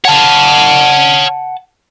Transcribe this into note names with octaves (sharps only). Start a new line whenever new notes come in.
C#5 F5 F#5 A5